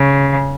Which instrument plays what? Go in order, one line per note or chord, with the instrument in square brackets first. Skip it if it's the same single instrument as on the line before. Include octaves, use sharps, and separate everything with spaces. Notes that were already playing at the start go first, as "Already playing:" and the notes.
Already playing: [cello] C#3